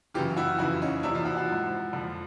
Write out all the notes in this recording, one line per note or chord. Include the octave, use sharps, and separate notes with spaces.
F#2 C#3 E3 F4 G4
E4 F#4
F2 C#3 E3 E4 F#4
C#4 D#4
E2 C3 F3 D4 E4
D#4 F4
E4 F#4
E4 F#4
G#2 F3
F2 D3 F3